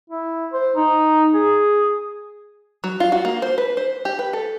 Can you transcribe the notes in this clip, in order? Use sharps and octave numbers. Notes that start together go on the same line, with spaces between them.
E4
C5
D#4
G#4
F#3
F4
F#4
A#3
C5
B4
C5
G4
B4
A4